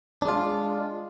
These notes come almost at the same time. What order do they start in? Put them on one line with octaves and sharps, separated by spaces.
D4 G#3 F4